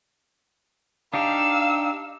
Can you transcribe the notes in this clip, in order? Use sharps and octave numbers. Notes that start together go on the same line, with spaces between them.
D4 D#4 G4 F5 E6